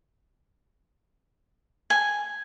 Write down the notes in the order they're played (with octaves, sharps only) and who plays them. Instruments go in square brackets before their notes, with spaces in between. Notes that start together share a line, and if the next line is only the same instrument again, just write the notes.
[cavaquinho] G#5